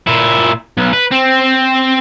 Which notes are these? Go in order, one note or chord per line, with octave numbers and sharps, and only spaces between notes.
A#2 E4
B1
B4
C4